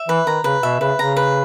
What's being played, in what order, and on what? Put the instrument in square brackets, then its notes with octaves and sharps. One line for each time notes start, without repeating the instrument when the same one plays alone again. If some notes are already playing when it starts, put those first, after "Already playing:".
Already playing: [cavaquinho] E5
[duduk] E3 [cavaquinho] B4
[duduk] D#3 [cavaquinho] A#5
[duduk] C#3 [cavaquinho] B4
[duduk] B2 [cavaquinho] E5
[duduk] C#3 [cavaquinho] B4
[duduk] C#3 [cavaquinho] A#5
[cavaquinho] B4